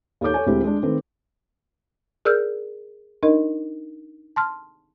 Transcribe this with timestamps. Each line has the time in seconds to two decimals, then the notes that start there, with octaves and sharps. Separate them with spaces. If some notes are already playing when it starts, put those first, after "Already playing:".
0.21 D#2 A4 C#5 D6 G6
0.34 A4 C#5 G#5
0.46 D2 G#3 C4 E4 G4
0.64 G#3 D4
0.83 D#3 A3 C4 B4
2.25 G#4 A#4 D5 E6 F6 G6
3.23 D4 D#4 A#4 D#5
4.36 A5 C6 F6